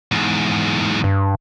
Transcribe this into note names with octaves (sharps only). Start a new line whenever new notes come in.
E2 G#2
G2